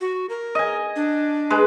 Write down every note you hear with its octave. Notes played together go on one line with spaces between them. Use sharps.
F#4
A#4
D#5 G#5
D4
G#3 B4